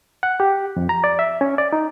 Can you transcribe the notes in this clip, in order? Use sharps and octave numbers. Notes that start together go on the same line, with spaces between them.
F#5
G4
F2
A#5
D5
E5
C#4
D5
D#4